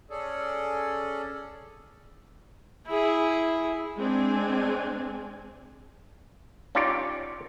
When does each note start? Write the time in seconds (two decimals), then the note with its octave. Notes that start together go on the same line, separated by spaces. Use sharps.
0.10 C#4 G#4 A4 D5
2.87 E4 G#4
3.97 G#3 C4 D4 G#5
6.75 C#4 D#4 F4 G4 C#5 D5